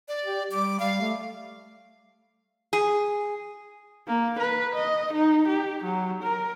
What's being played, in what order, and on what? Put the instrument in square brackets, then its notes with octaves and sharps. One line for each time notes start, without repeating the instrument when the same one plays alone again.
[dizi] D5
[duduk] G4
[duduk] G3 [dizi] D6
[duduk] G3 [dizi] F5
[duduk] A3
[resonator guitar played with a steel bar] G#4
[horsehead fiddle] A#3
B4
D#5
D#4
G4
F#3
A#4